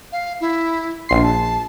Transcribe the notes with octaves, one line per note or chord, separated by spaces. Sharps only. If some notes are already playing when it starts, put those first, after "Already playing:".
F5
E4
A#1 C6 C7
A5